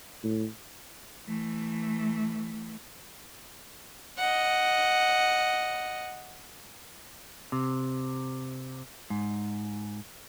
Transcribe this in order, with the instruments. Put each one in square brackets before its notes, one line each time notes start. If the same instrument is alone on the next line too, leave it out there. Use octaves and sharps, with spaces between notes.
[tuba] A2
[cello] E3 A3
[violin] D#5 F#5
[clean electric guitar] C3
G#2